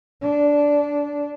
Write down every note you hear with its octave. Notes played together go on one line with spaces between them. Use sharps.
D4